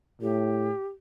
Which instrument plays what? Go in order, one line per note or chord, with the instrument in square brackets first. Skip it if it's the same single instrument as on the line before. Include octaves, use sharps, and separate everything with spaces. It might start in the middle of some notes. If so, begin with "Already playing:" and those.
[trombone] A2 [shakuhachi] G4